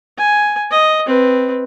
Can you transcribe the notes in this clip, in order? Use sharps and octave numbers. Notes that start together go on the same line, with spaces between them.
G#5
D#5
C4 B4